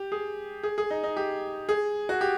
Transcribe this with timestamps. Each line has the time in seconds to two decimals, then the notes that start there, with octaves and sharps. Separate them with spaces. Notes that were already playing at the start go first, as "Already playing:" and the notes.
Already playing: G4
0.12 G#4
0.63 G#4
0.78 G#4
0.90 D#4
1.04 D#4
1.17 G4
1.69 G#4
2.09 F#4
2.21 G4